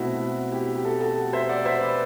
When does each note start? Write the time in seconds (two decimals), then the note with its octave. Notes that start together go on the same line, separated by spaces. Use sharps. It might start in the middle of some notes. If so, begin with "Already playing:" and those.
Already playing: B2 A3 C4 E4 F#4
0.20 F#4
0.52 E4 G4
0.76 G4
0.84 F#4 A4
1.01 F#4 A4
1.33 C5 E5
1.49 D5 F#5
1.65 C5 E5
1.81 B4 D5